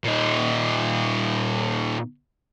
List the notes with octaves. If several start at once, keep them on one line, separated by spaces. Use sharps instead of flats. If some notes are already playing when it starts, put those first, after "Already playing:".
A#2 D#4